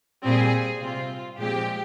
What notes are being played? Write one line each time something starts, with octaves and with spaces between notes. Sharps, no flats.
A#2 G3 C4 G#4
C3 G3 C4 F4
A#2 F3 G#3 C4 G4